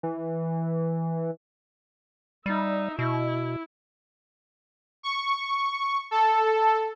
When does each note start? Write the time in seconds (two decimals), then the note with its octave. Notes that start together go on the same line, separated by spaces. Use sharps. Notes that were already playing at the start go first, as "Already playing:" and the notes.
0.03 E3
2.46 G3 D#4 E5
2.99 B2 E4
5.03 C#6
6.11 A4